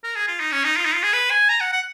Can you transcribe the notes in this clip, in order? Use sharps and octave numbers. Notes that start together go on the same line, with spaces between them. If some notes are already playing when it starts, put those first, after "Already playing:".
A#4
G#4
F4
D#4
C#4
D#4
F4
D#4
F4
G#4
B4
G#5
A#5
F#5
F#5